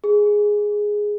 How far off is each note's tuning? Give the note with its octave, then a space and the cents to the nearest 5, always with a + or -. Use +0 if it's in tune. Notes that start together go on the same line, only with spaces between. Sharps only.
G#4 +0